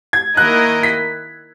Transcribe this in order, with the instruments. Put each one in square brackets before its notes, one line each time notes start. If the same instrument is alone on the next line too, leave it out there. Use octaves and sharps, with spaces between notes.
[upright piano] G#6
[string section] D#3 A#3 E4 A#4 D#5 [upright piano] F#6
[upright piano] B6